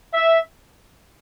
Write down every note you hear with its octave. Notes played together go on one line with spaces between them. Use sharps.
E5